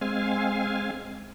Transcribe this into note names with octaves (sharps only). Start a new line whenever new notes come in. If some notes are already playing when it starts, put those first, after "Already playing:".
G#3 C4 F5 G#5